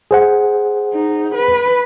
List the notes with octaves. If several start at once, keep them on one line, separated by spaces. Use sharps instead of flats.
G#4 C5 F#5
D#4
B4